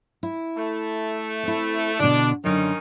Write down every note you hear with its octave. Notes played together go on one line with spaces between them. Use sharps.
E4
A3
C4 E4
B2 D3 D4
F#2 D3 D#3 C#4 D#4